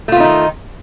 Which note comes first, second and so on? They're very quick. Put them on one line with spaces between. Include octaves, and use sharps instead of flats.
A3 F4 B3 D#4 D#3